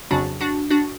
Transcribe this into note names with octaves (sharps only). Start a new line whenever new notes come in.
F2 C#3 F#3 D4 F#4
D4 F#4
D4 F#4